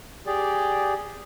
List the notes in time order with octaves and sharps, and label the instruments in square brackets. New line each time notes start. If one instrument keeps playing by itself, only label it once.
[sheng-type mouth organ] G4 G#4 D5